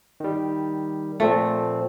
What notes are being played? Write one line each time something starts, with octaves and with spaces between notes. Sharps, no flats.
D#3 G3
A#2 F3 A3 C4